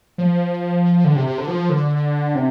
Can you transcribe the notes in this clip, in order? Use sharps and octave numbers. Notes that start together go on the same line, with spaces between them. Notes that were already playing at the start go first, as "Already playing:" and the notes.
F3
D3
C3
C3
D3
F3
D3
C3